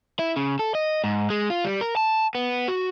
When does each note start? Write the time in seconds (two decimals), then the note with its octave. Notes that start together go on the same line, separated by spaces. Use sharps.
0.19 E4
0.36 C#3
0.59 A4
0.75 D#5
1.04 G#2
1.30 G#3
1.50 F4
1.65 G3
1.81 A#4
1.97 A5
2.35 B3
2.68 F#4